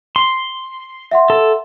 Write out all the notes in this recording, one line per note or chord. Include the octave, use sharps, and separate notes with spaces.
C6
E5 F#5 C6
A4